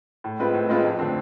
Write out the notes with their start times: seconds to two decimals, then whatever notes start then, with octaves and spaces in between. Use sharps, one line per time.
0.24 A2
0.39 G#3 C4 F4 B4
0.54 A2
0.69 G#3 C4 F4 B4
0.84 F2
0.99 D3 A3 C4